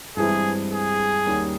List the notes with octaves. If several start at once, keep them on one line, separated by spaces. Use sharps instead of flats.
G2 E3 G#3 C4 E4 G#4
G#4
D#2 D#3 G3 A#3 C#4